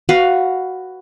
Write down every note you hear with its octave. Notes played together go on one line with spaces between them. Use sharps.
F#4 B4 F5